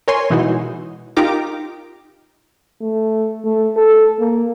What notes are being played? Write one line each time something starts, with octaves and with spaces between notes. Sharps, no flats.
A#4 C#5 G#5 C6
B2 E3 G#3 D#4 E4 F#4
D#4 F4 G4 A#4 A#5 D6
A3
A3
A4
A#3